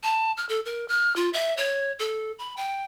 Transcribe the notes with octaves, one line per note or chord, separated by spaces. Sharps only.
A5
F6
A4
A#4
F6
F4
E5
C#5
A4
B5
G5